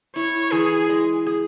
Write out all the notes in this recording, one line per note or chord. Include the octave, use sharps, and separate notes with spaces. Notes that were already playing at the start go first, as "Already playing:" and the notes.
E4 C#5
E3 G#4
G#3
G#4